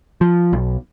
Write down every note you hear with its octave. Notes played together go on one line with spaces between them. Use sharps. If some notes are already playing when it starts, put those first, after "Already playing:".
F3
B1